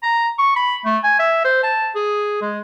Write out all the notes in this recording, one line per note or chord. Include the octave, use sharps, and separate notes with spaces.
A#5
C#6
B5
A3
G#5
E5
C5
A5
G#4
G#3